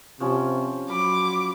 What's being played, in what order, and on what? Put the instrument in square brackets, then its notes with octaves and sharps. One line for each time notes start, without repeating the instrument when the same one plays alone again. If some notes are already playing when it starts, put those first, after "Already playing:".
[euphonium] C3 [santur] F3 C#4
[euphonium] F#3 [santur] B5 [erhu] D6